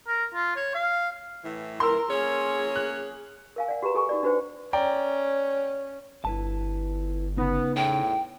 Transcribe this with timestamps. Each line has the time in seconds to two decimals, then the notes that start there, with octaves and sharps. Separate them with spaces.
0.08 A#4
0.34 F4
0.56 C#5
0.75 F5
1.44 A2 E3
1.80 A#4 A#5 C6 E6
2.10 A#3 C#4 G#4 C#5
2.76 F#6
3.56 A#4 F5 G#5
3.68 D5 F#5
3.82 F#4 G4 B4 A#5
3.94 G4 A4 G#5 C#6
4.09 D#4 F#4 D5
4.23 D4 F#4 B4 C5 G5
4.73 C#4 D5 G5 A#5
6.25 G1 E4 B4 A5
7.38 C#3 B3 D#4
7.76 E2 A2 G5